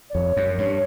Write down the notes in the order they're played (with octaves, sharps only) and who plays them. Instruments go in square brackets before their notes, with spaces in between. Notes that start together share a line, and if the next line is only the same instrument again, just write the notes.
[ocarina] D5
[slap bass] F2 [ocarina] C#5
[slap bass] F#2
G2